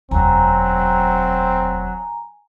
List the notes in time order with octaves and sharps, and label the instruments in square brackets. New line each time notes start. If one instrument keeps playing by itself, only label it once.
[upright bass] E1 D2 [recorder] F#3 [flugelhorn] C4 [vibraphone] G#5 A#5